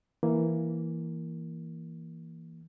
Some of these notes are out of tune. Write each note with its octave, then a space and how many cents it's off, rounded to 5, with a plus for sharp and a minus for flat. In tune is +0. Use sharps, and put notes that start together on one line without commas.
E3 +0 A#3 +0